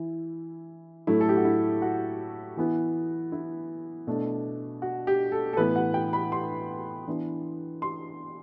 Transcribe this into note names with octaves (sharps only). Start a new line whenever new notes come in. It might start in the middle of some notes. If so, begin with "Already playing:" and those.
Already playing: E3 E4
A2 F#3 A3 E4
A4
G4
F#4
E4
F#4
E3 B3 E4
E4
B2 A3 D4
F#4
G4
A4
A4
A2 E3 B3 B4
F#5
G5
B5
C6
E3 B3 D4
C6